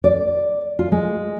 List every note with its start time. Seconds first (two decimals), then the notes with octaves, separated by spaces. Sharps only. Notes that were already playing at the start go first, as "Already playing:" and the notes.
0.04 D5
0.79 F4
0.92 G#3